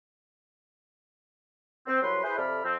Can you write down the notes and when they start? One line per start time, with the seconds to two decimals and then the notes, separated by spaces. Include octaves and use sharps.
1.87 C4
2.02 C2 F#3 B4 C6
2.23 E4 G#4 B4 C5
2.37 F2 C3 A4 D5 B5 F6
2.64 F2 C4